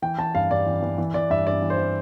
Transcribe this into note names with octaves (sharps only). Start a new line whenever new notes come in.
E3 G5
E3 A5
G2 F5
G2 D5
E3
E3
E3
E3 D5
G2 E5
G2 D5
E3
C5
E3